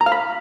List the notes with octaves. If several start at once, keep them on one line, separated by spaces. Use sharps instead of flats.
A#5
F5
B5